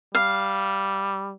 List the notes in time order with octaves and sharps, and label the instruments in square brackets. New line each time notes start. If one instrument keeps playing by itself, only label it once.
[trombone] G3 [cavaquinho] F5